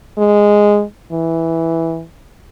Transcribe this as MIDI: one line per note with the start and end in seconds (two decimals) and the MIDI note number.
0.18 0.83 56
1.12 2.04 52